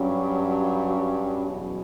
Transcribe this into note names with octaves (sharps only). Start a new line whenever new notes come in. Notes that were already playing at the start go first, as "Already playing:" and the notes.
Already playing: G2 F#3 C#4
G4
F#4
E2 B2 F#3 C#4 F#4